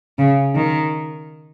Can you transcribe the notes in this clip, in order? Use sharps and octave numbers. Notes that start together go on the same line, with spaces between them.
C#3
D#3